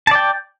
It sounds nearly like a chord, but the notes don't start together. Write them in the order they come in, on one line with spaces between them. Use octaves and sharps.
A5 D5 G5